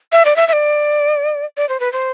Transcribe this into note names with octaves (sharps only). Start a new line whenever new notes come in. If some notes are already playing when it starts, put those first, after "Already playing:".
E5
D5
E5
E5
D5
D5
C5
B4
C5